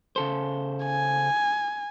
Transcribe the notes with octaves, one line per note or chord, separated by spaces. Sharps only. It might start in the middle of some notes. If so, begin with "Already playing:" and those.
C#3 A4 C5
G#5